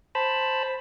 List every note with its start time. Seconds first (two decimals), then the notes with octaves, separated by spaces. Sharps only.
0.15 C5 A5 B5